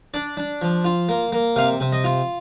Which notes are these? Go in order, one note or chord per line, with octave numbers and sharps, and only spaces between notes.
D4 D5
D4
F3
F4
A#3
A#3
C3 F5
C3
D#5
F4